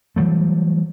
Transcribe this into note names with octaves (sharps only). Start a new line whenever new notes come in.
E3 F#3 G3 A3